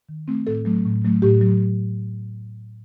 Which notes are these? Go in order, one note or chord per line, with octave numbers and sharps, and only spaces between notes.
D#3
A3 C4
A2 A4
F#3 A3
A2
F#3 A3
A2 G4
F#3